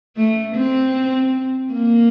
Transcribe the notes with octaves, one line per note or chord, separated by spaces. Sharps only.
A3
C4
A#3